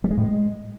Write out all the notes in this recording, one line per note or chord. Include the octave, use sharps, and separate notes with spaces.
G3
G#3
A2
G#3